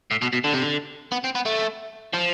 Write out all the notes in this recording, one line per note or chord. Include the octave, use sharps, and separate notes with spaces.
A2
B2
B2
D3
C3
D3
B3
C4
B3
A3
F3